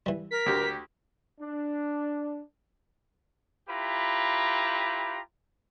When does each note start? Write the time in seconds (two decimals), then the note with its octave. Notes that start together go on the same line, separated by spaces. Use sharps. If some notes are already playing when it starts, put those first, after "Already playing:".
0.06 E3 G3
0.31 A#4 B6
0.46 D2 G4
1.41 D4
3.68 E4 F4 G4 B4 A#5